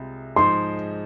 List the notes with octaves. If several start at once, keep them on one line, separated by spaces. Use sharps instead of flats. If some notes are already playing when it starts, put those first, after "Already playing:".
Already playing: C2 C3 G#3 F4 G#4
G#2 F3 G#3 D#4 C6